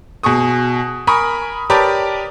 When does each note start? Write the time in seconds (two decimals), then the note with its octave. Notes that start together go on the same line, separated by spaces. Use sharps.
0.23 B2 G#4 C#6 D#6
1.07 A#4 G#5 B5 C#6 D#6
1.70 G4 A#4 B4 C#5 D5 A5